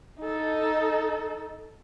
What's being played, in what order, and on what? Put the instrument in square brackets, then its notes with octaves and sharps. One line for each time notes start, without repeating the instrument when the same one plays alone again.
[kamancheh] D#4 A4